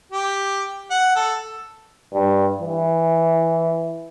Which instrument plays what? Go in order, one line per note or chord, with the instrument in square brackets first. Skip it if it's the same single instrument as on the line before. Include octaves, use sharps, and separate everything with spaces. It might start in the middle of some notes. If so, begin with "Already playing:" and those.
[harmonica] G4
F#5
A4
[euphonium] G2
E3